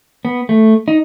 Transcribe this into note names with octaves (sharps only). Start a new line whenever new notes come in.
B3
A3
D#4